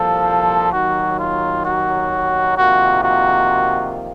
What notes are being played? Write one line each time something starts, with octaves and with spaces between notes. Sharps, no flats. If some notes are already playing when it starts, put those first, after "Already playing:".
Already playing: C2 A#2 F3 A4
D#2 D#3 F#3 F#4
F4
F#4
F2 C3 D#3 A#3 F4 F#4
F#4